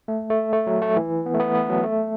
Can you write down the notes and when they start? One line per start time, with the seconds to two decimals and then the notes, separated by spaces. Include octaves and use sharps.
0.08 A3
0.30 A3
0.53 A3
0.67 F#3
0.82 A3
0.96 E3
1.26 B3
1.34 A3
1.40 B3
1.55 B3
1.70 F#3
1.84 A3